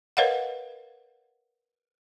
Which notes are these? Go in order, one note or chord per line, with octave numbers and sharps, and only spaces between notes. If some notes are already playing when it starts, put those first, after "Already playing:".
A#4 B4 C#5 D#5 F5 F#5